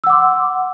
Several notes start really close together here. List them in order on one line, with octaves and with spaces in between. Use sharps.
E6 F#5 D6 C6